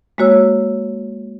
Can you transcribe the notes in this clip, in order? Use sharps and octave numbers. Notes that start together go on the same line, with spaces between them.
G#3 A#3 F#4 C#5 E6